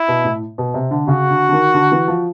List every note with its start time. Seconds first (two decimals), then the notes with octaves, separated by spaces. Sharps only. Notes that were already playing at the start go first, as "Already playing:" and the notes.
Already playing: E4
0.08 B2
0.24 A2
0.58 B2
0.74 C3
0.91 D3
1.08 C#3 F#4
1.30 D3
1.49 D3
1.52 D#3
1.74 D3
1.92 E3
2.08 F3